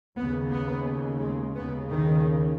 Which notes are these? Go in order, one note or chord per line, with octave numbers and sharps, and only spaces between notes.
D#2 C#3 B3
B3
G#3
D#2 C#3 B3
D#3